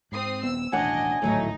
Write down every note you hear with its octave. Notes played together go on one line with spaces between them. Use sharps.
G#2 C4 D#6 C7
D#1 B3 E6
D#1 A1 B2 D4 C#5 D#5 F#5 G#5
G#1 D2 A2 F#3 A3 D#4